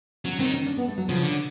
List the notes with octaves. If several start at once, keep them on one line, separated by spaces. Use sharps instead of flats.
F#3 C#4
D#3 C4
C#4
D4
B3
A3
F#3
C#3 F3
D3